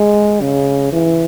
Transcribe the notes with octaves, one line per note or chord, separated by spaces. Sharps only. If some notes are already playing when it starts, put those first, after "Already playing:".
Already playing: G#3
C#3
E3